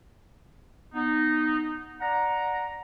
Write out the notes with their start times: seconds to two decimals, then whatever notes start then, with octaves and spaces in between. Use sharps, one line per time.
0.94 B3 D#4
2.01 D5 F#5 A#5